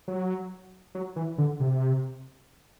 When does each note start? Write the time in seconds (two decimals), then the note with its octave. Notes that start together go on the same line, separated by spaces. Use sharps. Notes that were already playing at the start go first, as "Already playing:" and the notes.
0.08 F#3
0.95 F#3
1.16 E3
1.38 D3
1.60 C3